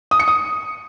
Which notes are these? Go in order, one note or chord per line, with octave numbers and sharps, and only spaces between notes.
D#6
C#7
D#6